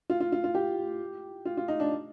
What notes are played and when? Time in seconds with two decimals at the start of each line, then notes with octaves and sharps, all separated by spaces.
0.10 F4
0.20 F4
0.32 F4
0.44 F4
0.55 G4
1.45 F4
1.57 F4
1.68 D#4
1.80 D4